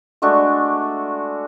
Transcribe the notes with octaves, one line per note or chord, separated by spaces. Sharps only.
G#3 A3 D4 F#4